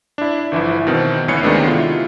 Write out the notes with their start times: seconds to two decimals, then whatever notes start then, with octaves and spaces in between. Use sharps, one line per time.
0.18 D4 E4
0.52 G1 E3 F3 E4
0.87 B2 D#3 C4
1.28 D2 E3 B3 C#5 C7 C#7
1.43 C3 D#3 G#3 A3 B3 D4
1.67 E4 F4